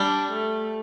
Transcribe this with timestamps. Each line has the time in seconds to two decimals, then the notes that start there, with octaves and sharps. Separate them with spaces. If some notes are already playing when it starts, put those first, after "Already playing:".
Already playing: G3 D4
0.33 A3